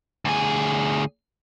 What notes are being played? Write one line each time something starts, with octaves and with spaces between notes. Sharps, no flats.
D2 G#4